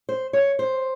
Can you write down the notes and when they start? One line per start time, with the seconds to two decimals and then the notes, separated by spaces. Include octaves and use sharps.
0.09 C5
0.33 C#5
0.59 C5